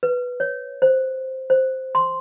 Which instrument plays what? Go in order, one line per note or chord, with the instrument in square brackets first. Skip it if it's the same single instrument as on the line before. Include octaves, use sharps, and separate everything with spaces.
[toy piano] B4
C#5
C5
C5
C6